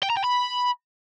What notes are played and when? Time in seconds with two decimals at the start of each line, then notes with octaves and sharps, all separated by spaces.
0.03 G5
0.10 A#5
0.17 G5
0.24 B5